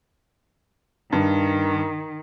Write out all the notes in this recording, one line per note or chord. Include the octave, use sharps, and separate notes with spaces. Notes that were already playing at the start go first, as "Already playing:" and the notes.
G2 D#3